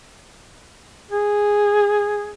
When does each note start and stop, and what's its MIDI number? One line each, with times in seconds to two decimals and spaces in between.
1.11 2.32 68